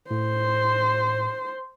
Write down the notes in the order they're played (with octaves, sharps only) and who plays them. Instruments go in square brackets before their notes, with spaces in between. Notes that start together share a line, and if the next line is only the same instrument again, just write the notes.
[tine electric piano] A2 [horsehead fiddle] C5